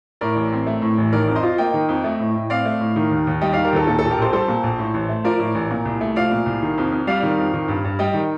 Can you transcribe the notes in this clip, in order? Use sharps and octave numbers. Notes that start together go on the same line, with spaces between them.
A2 A#4 D5
A1
C4
A3
A2
A1
D#3 A#4 D5
F2
C5 D#5
F4
A#3 D#5 G5
D#3
F2
A3
A2
A2
C4 D5 F5
A3
A2
D#3
D#2
D#2
G3 D#5 G5
D#3 D5 F5
G4 A#4
D#2 A4
A#2 A4
A#1 A4
G4 A#4
A#1 A4 C5
G3 A4 C5
A#2
A#1
A2
A1
A3
F3 A#4 D5
A2
A1
A#2
C2
A3
F3 D5 F5
A#2
C2
D#3
F2
F2
G3 D5 F5
D#3
F2
D#3
G2
G2
G3 D#5 G5
D#3